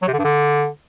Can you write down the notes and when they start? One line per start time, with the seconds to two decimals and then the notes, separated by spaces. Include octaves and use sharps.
0.02 F#3
0.08 C3
0.13 D3
0.19 G2
0.24 D3